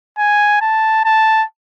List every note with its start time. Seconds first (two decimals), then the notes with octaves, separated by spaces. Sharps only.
0.18 G#5
0.61 A5
1.05 A5